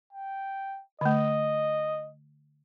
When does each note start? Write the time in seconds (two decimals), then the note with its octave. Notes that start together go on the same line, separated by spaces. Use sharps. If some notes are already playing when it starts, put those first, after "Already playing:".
0.13 G5
1.01 D3 A3 D#5